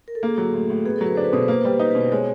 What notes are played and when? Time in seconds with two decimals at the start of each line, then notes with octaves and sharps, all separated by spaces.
0.08 A#4
0.15 A4
0.23 A#3 G#4
0.38 F#3
0.54 A2
0.70 A2
0.85 B3 G#4
0.96 A4
1.01 F#3
1.06 B4
1.15 D4 C5
1.24 B4
1.33 B2 C5
1.43 B4
1.48 A#3 C5
1.61 G3 B4
1.79 D#4 B4
1.91 B4
1.95 B2
2.01 C5
2.12 G#3 C#5